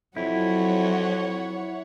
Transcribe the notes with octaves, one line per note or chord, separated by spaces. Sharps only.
F2 F#3 E4 C#5 F#5